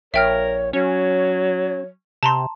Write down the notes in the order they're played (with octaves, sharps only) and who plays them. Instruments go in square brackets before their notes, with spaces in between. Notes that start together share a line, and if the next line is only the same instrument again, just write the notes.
[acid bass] A#1 [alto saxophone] A#4 [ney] C#5 [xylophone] E5 G5 F6
[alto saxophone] F#3 [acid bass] C#4 [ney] C#5
[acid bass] C3 [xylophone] A5 A#5 C6